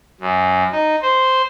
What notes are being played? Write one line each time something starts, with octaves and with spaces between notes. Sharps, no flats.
F#2
D#4
C5